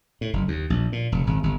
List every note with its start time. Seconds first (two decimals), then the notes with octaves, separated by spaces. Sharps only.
0.21 A2
0.33 F#1
0.48 D#2
0.70 A#1
0.92 A#2
1.12 F1
1.27 G#1
1.43 G1